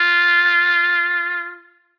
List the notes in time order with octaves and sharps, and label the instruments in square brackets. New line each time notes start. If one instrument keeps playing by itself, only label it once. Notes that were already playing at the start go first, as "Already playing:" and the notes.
Already playing: [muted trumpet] F4